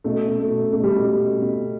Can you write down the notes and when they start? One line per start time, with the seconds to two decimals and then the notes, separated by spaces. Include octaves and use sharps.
0.04 B2 A3
0.28 B2
0.39 A3
0.50 B2
0.73 B2 A3
0.84 G3
0.96 B2
1.05 G3
1.19 B2
1.42 B2